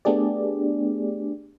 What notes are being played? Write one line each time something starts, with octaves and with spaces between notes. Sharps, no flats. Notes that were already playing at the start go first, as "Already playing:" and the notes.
A3 B3 D4 G4 G#4 D5